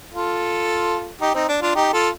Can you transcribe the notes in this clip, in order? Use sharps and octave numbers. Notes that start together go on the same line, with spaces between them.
F4 A4
D#4 G4
C4 D#4
D4
D4 F4
D#4 G4
F4 A4